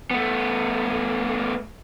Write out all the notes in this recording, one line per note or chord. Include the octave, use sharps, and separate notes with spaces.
A3 B3